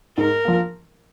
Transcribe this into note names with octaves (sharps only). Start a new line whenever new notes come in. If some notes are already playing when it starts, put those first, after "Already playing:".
G#2 A#4
F3 A#3